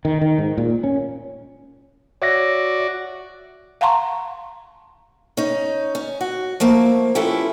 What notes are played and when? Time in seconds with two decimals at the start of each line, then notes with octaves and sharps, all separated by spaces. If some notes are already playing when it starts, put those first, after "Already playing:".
0.05 D#3
0.22 D#3
0.38 G#2
0.58 A#2
0.84 C#4
2.22 F#4 C#5 D5 E5 A#6
3.81 F5 F#5 A5 A#5 C6 C#6
5.37 C#4 D#4
5.95 C#4
6.21 F#4
6.60 F3 A3 A#3
7.15 C#4 E4 F4 G4 A4 B4